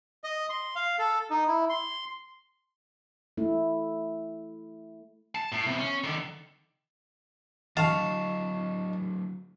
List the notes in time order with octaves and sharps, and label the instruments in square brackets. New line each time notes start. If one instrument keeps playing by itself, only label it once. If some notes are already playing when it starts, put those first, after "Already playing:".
[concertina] D#5
C6
F5
A4
D#4
E4
C6
[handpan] A3 E4
[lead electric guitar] A5
A2
C3 B3
C#4
D3 D#3
[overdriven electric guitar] D3 F#3 [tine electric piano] D#5 C#6 [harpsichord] F5 A5